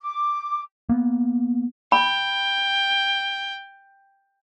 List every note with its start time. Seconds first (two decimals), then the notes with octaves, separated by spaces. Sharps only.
0.01 D6
0.89 A#3 B3
1.92 G5 B5